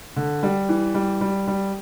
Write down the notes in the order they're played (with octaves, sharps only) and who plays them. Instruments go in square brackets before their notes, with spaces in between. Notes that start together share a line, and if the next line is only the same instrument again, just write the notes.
[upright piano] D3
G3
E3
G3
G3
G3